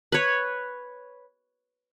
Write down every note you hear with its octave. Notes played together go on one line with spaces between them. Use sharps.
B4 C#5